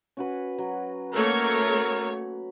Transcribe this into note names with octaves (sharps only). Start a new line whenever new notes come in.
C#4 F#4 B4
F#3
A3 A#3 A#4 C#5
B5